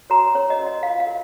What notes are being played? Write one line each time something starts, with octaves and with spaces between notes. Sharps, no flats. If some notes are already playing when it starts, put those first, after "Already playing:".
F#4 A#4 C#5 A#5
C#4 C#5
D#5
F#4 A#4 C#5
D#5
F4 F5
F5
A#4